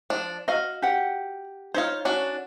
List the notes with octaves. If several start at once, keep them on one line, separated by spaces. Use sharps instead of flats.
F3 D4
F#4 D#5 F5
G4 F#5
D#4 F4 C5 C#5
C#4 D4 F#4